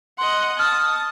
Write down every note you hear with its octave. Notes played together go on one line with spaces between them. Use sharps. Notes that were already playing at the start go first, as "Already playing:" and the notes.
D#5 F#5 C6
A5 D#6 F6